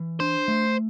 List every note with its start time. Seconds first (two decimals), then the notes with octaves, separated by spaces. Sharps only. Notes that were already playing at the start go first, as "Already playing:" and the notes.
Already playing: E3
0.20 D4 C5
0.48 A3